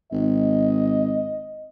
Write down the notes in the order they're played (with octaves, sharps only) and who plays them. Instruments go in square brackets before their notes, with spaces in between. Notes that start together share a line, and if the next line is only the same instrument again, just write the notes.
[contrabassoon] G#1 [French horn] D#5